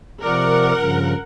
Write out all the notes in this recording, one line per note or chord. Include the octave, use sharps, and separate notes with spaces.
C3 F3 A#4 D5 F#5
G2 C#3 F3